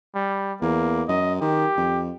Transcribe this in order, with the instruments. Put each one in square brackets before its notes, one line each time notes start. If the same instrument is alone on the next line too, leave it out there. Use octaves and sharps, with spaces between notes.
[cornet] G3
[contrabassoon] E2 [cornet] A#3
[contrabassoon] F#2 [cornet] D#5
[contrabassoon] D#3 [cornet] G4
[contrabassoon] F2